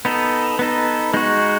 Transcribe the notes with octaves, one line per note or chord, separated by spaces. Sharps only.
B3 D#4 A4
B3 D#4 A4
G#3 D#4 F#4